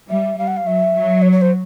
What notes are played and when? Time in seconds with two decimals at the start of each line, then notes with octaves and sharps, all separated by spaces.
0.10 G3 E5
0.38 G3 F5
0.47 F#5
0.57 F5
0.66 F#3 E5
0.94 F#3
1.22 C#5
1.32 C#5
1.42 C5